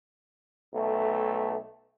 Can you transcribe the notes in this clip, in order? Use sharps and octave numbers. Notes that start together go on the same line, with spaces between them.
B1 A3